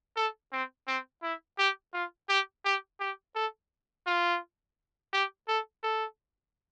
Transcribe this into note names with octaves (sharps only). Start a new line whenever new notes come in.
A4
C4
C4
E4
G4
F4
G4
G4
G4
A4
F4
G4
A4
A4